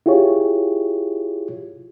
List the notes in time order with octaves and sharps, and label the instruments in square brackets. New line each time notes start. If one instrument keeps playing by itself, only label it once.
[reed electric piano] E4 F4 G4 G#4 C#5